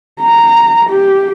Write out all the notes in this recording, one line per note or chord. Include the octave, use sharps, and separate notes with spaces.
A#5
G4